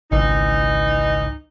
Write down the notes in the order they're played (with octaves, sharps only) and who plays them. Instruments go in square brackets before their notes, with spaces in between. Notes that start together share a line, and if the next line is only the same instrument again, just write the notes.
[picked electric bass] G#1 C#2 [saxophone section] E3 D#4